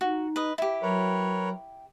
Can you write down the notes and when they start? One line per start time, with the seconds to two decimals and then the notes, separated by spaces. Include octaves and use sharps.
0.01 D#4 F#4
0.36 B4 D#5
0.58 E4 G4
0.82 F#3 A#4 B4 C#5